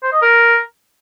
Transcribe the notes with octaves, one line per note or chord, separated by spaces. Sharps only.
C5
D#5
A#4